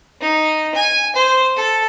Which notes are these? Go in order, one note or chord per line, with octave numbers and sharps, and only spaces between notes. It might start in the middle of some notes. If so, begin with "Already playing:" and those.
D#4
G#5
C5
A4